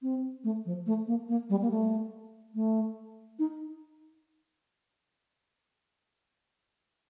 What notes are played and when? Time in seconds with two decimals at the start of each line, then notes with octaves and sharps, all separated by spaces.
0.02 C4
0.44 A3
0.66 F3
0.86 A3
1.07 A#3
1.29 A#3
1.50 G3
1.62 A#3
1.71 A3
2.55 A3
3.39 D#4